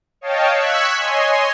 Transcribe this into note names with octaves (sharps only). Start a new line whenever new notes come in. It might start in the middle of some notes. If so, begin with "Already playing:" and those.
C#5 D#5 F5 G5 A5
C#6 E6 F#6 G#6 B6
C#5 D#5 G#5 C6